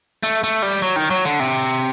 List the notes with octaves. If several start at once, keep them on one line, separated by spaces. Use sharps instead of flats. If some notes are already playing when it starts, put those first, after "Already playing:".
A3
A3
G3
F#3
D#3
F#3
D3
C3